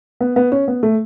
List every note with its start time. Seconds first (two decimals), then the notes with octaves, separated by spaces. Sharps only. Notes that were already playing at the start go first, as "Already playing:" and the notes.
0.21 B3
0.36 B3
0.52 C#4
0.68 B3
0.83 A3